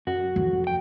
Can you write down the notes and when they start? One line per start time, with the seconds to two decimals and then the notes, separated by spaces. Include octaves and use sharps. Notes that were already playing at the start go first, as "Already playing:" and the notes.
0.07 F#2 F#4
0.36 F2
0.67 G5